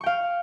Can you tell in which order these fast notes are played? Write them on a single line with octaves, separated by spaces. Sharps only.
C#6 G5 F5